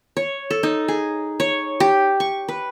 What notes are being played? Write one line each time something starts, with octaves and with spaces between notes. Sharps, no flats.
C#5
A4
D#4
G#4
C#5
G4
C#6
B4